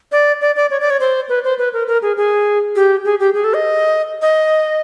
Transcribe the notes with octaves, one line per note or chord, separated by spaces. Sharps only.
D5
D5
D5
C#5
D5
C#5
C5
B4
C5
B4
A#4
A#4
G#4
G#4
G4
G#4
G4
G#4
A4
D#5
D#5